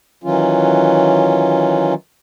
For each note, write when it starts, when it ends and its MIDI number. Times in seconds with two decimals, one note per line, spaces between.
0.24 1.94 51
0.24 1.94 52
0.24 1.94 54
0.24 1.94 61
0.24 1.94 65